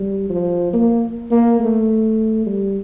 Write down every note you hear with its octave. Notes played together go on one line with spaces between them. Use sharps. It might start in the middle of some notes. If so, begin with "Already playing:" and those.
Already playing: G3
F3
A#3
A#3
A3
G3